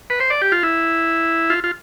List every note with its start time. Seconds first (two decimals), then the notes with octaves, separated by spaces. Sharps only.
0.10 B4
0.20 C5
0.30 D5
0.42 G4
0.52 F4
0.63 E4
1.50 F4
1.64 F4